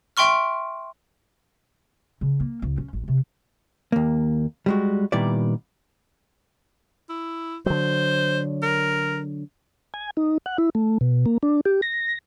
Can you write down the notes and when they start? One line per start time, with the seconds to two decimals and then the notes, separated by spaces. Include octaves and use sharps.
0.17 E5 G5 C6 C#6 F6
2.21 C#3
2.40 A#3
2.62 C#2
2.78 C#4
2.93 A1
3.08 C3
3.92 D#2 A#3
4.66 G3 G#3 F#4
5.12 A#2 D#3 G3 B3 E4 D5
7.10 E4
7.66 D3 F#3 C5
8.62 A#4
9.94 G#5
10.17 D#4
10.46 F#5
10.58 E4
10.75 A3
11.01 B2
11.26 A#3
11.43 D4
11.65 G4
11.82 A#6